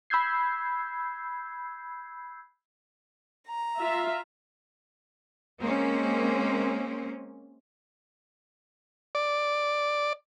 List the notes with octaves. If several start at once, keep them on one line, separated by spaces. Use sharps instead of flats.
B5 E6 G6 G#6 C7
A#5
F4 E5
G#3 A#3 C4 C#4
D5